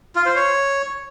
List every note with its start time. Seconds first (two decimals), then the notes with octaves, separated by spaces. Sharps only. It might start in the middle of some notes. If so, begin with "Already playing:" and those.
0.16 F4
0.26 C5
0.36 C#5